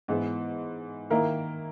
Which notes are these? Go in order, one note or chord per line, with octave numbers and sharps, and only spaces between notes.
G#2 E3 B3
D#3 A#3 E4 A#4